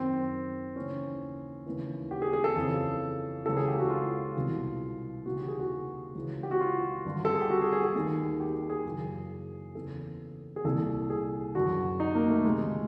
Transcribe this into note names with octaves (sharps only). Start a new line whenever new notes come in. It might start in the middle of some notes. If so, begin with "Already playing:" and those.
Already playing: F#2 D#3 C4
D#2 C#3 E3 C#4
D#2 C#3 E3
G4
G#4
G#4
A4
F2 C#3 E3
C#2 C#3 E3 A4
G#4
G4
F#4
F4
C2 B2
D#2 C#3 E3 F#4
G4
G#4
F#4
C#2 C#3 E3
G4
F#4
F4
G2 D3
A4
G#4
G4
F#4
G#4
G#4
G#4
D#2 D#3
G4
G4
G#4
F#2 C#3 E3
E2 C#3 E3 A4
G#4
C2 A#2 A4
G#4
F#2 D3 F#4
D#4
A#3
A3
C#2 C3 D#3 G#3